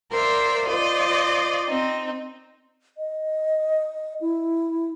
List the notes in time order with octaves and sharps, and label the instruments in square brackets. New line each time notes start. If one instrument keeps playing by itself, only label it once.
[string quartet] A#4 C5 D5 E5 F5
F4 C5 D5 D#5
C4 D#4
[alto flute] D#5
E4